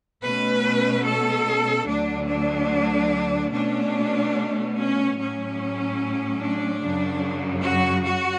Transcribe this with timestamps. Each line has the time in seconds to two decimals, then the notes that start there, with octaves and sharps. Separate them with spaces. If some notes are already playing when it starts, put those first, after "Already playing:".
0.23 B2 A3 C#4 B4
1.06 A4
1.88 D2 D3 F#3 D4
2.28 D4
3.52 B2 A3 C#4 D4
4.76 C#4
5.18 A2 F#3 C#4
6.41 D4
6.82 F#2 C#3 F#3
7.64 F#4
8.05 F#4